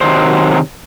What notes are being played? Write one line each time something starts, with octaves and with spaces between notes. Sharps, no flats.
C3 D#3 F#3 C5